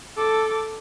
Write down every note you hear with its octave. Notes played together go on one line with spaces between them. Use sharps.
A4 D6